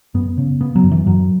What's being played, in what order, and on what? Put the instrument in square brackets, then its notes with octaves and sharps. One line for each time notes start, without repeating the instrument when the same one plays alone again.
[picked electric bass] F#2 B3
C#3
C#3 B3
F#3
F#2
E3
F#2 F#3